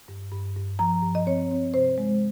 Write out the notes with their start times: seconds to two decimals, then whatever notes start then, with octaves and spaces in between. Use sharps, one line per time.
0.08 G2
0.32 G2
0.56 G2
0.79 F3 A#5
1.03 G2
1.15 D#5
1.26 C4 C#5
1.51 C4
1.74 C3 C5
1.98 G#3